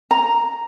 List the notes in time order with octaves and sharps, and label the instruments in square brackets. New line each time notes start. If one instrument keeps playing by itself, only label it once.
[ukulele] A#5